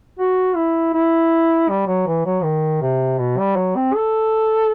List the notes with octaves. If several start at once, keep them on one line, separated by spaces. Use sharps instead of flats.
F#4
E4
E4
G3
F#3
E3
F#3
D#3
C3
B2
G3
F#3
C4
A4